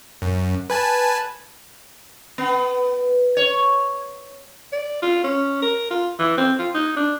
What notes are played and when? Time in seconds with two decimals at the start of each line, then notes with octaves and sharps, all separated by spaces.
0.22 F#2
0.70 B4 G#5 A5
2.38 B3
3.37 C#5
4.72 D5
5.02 F4
5.24 C#4
5.62 A#4
5.91 F4
6.19 E3
6.37 C4
6.59 F4
6.74 D#4
6.96 D4